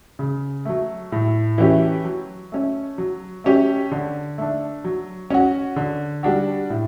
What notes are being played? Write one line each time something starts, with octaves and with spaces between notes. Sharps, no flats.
C#3
F#3 A3
A2
E3 A3 C#4 G4
F#3
A3 C#4
F#3
A3 C#4 G4
D3
A3 D4
F#3
C#4 F#4
D3
G3 D4 F#4
A2